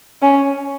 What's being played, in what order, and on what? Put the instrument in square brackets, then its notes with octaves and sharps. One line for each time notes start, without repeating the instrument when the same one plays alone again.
[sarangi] C#4